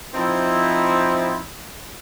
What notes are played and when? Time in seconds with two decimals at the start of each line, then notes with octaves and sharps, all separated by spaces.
0.14 F3 C4 D#4 E4